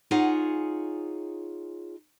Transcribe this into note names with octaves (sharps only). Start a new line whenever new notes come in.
D#4 F4 G#4 C#5 F#5 G#5